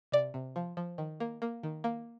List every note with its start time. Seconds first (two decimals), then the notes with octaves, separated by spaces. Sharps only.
0.12 C3 D5
0.34 C3
0.56 F3
0.77 F3
0.98 D#3
1.20 A#3
1.42 A#3
1.63 D#3
1.84 A#3